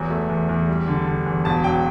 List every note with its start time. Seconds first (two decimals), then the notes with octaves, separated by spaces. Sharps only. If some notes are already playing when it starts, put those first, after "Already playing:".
Already playing: E2 F#3
0.11 A3
0.30 E2
0.49 E2
0.68 G3
0.88 D3
1.06 D3
1.26 E2
1.45 E1 A5
1.64 F#3 G5